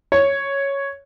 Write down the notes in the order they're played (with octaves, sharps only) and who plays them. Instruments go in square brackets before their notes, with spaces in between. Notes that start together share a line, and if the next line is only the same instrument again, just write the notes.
[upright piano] C#5